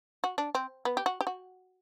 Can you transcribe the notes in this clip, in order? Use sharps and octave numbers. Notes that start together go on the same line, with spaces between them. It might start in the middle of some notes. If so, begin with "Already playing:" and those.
F#4
D4
C4
B3
G4
F#4
G4
F#4